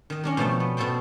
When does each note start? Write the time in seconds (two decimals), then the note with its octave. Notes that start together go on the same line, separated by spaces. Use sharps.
0.10 D#3 D#5
0.24 C#4 D4 A#4
0.37 B2 F3 A3 G5
0.60 B3
0.77 B2 F#4 A4 C5 G5